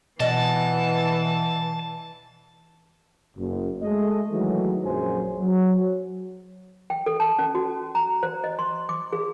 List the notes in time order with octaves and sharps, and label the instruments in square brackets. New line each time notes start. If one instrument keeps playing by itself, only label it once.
[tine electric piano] B2 [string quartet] E3 [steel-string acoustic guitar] D5 D#5 F#5 [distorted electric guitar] A5
[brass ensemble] F#1
G#3 A3 D#5
D#3 E3 F#3 G#3 A3
A#1 F#2 F#3 G#4 C5 G#5
F#3
[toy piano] G5
A4
A5
C#4
F#4
A#5
C5
D#5
C6
D6
G#4